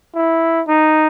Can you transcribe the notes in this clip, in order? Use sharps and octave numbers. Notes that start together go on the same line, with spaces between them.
E4
D#4